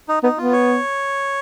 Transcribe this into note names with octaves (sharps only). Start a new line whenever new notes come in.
D#4
B3 D#4
B3 F4
C#5